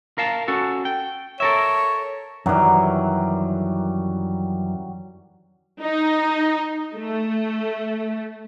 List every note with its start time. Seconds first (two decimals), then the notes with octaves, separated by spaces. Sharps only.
0.18 A#4 F5 A5
0.48 C#4 F#4 A4
0.85 G5
1.40 A4 A#4 C#5 E5
2.46 F#2 D#3 E3 F#3 G3
5.81 D#4
6.95 A3